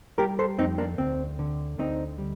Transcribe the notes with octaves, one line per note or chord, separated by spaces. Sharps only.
G3 G4 A#4
A4 C5
F2 C4 D#4
A#3 D4
D2 C4
D3
D2 C4 D#4
G3